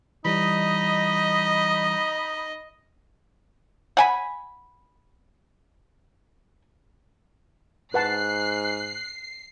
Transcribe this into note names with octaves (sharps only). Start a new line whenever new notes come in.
E3 G3 D#4 D#5 B5
F#5 G#5 B5
G#2 B4 F#5 A5 F#6 C7